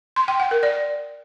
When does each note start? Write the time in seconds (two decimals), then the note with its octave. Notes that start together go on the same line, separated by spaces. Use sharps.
0.16 C6
0.28 G5
0.40 F#5
0.51 A#4
0.63 D5